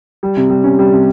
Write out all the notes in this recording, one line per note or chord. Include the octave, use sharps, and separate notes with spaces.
G3
C3
G3
C#4
G3
C3